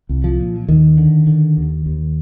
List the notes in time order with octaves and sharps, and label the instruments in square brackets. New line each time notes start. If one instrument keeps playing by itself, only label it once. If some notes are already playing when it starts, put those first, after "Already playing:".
[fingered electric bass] C2
F3
A#2
D#2 D#3
D3
D3
D#2
D#2